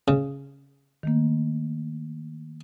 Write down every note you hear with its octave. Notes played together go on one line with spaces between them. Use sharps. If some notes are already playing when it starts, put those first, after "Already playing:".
C#3
D#3 A3 A#3